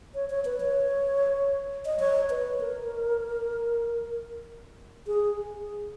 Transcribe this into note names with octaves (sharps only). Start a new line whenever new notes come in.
C#5
C#5
B4
C#5
D#5
C#5
B4
A#4
G#4